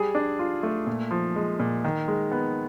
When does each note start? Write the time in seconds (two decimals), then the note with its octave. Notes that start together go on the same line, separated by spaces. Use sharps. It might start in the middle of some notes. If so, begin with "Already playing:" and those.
Already playing: G3 G#4
0.15 D4
0.39 F4
0.63 A3
0.87 A#2
1.11 F3
1.36 G#3
1.60 A#2
1.84 D#3
2.08 G#3
2.32 B3